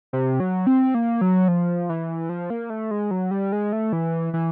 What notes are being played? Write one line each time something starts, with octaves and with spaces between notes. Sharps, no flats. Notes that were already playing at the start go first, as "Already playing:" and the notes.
C3
F#3
C4
A#3
F#3
F3
E3
F3
A#3
A3
G#3
F#3
G3
G#3
A3
E3
E3